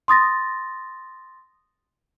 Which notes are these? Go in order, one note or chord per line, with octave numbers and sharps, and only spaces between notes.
C6 D#6 A6 A#6